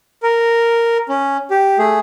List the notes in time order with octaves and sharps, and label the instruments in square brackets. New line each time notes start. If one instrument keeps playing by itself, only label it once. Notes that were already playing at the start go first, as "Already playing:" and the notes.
[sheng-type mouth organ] A#4
C#4
G4
A3 G#4